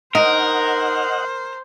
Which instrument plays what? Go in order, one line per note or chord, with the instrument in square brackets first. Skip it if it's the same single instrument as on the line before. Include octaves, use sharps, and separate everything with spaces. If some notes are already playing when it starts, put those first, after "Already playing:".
[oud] D#4 [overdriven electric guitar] A#4 [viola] C5 [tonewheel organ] D#5 F#5